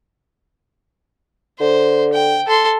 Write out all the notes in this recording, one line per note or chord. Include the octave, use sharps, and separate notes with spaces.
D3 C5
G5
A4 C6